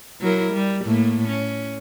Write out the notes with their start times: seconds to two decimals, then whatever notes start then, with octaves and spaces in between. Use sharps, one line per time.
0.21 F#3 E4 A#4
0.52 G3
0.85 A2 A3 A#3
1.28 C#4